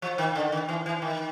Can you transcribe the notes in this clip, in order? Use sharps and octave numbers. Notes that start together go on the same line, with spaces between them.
F3
D#3
D3
D#3
E3
E3
D#3